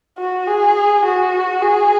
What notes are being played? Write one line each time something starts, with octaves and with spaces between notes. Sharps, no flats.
F#4
G#4
F#4
G#4